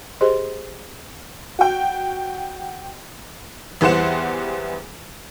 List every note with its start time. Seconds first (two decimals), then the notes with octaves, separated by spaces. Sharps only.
0.21 G4 G#4 C5 D#5 C6
1.59 F#4 G5
3.81 E2 E3 G3 C5 F#5 E7